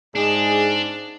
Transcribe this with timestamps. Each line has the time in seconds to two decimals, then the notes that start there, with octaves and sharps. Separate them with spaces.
0.16 G#2 D4 G#4